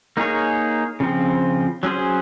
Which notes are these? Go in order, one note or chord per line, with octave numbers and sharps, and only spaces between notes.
A#3 D#4 G#4 C#5
C#3 F3 C4
F#3 C#4 G#4 C5